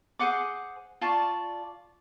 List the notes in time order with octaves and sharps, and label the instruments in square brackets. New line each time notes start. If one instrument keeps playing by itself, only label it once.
[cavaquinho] G#4 C5 F#5 D6
F4 D5 A5 C#6